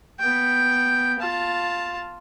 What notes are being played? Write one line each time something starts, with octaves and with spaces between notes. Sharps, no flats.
B3 G5
F4 A5